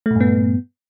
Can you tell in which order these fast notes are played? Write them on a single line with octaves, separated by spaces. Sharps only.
A3 A#2 G2 B3